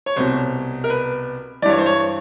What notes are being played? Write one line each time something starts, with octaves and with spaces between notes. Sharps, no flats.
C#5
C2 B2 C5
A#4
B4
G2 E3 C#5 D5
C5
C#5